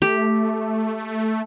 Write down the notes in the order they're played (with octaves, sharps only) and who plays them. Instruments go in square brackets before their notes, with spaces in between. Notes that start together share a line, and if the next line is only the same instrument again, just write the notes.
[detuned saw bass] A3 [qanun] G4